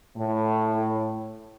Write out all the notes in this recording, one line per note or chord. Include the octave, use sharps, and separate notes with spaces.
A2